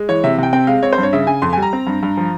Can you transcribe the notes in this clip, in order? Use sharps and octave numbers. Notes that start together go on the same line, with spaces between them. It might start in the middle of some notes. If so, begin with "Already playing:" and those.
Already playing: G#3
E3 C#5
C3 E5
C3 G5
C4 G5
G#3 F5
C4 C#5
C5
G2
C#5
C#3 E5
C#3 G#5
F2 C6
G3 G#5
A#5
C4
G2
G2
F3